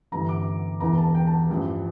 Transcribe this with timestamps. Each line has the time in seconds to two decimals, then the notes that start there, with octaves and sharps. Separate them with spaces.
0.12 G1 G2 E3 A#5
0.29 D6
0.80 E1 E2 E3 A#5
0.98 A5
1.14 G5
1.27 A5
1.49 A1 G2 F3